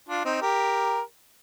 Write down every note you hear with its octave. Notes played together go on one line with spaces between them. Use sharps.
D4 F4
C4 D#4
G4 A#4